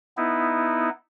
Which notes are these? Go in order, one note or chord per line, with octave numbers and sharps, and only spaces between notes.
B3 D#4 E4